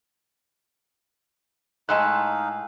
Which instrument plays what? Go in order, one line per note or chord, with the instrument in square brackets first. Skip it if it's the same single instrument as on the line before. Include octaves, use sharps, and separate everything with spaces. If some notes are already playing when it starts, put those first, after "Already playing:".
[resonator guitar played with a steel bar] A2 G#3 A5 [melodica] D#4 F5 [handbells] G#5 E6 F#6